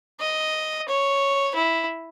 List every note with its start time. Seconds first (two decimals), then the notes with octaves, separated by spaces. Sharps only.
0.20 D#5
0.88 C#5
1.55 E4